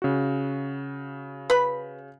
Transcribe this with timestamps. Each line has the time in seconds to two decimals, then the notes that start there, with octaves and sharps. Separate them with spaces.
0.02 C#3 F#4
1.50 B4 B5